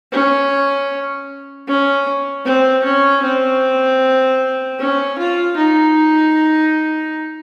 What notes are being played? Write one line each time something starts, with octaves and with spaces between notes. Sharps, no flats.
C#4
C#4
C4
C#4
C4
C#4
F4
D#4